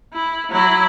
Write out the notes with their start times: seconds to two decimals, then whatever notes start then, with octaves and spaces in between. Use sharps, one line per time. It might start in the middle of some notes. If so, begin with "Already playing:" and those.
0.14 E4
0.51 F#3 E4